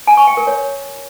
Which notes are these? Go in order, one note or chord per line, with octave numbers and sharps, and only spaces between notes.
G#5
C#6
G5
A#4
C#5